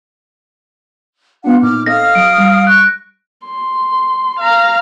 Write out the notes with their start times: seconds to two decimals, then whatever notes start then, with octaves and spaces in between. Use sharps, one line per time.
1.44 B3 D4 F4 F#5
1.62 A#2 D#4 D6 F6
1.86 C4 A4 D#5 F5 D#6 F6 A#6
2.15 F#3 D7
2.38 G3
2.67 C#6 F#6
3.45 C6
4.40 F5 A#5